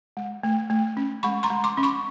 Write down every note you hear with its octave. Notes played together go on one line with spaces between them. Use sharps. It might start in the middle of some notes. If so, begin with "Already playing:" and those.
G#3
A3
A3
C#4
G#3 B5 C#6
A#5 C6
G#3
C6 D6
C#4
B5 C#6